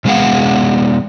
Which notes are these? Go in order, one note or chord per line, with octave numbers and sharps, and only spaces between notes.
C3 G#3 B3 G#4 F5 F#5